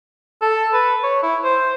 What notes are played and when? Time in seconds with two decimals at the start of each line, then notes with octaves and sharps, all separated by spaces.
0.42 A4
0.73 B4
1.03 C#5
1.23 E4
1.44 C5